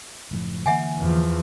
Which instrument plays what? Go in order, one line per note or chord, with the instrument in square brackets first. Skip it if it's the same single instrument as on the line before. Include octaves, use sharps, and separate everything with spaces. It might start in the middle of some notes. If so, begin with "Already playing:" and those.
[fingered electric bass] F#1 A2 F3
[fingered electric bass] D3 E3 A#3 [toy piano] E5 F#5 G#5
[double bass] E2 F3